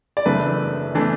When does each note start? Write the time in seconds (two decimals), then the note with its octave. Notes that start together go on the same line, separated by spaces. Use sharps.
0.17 D5
0.26 F#1 F#2 E3 A3 D4 B4
0.95 E3 A3 D4